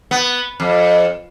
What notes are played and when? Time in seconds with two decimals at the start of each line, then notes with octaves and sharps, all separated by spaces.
0.11 B3
0.60 F2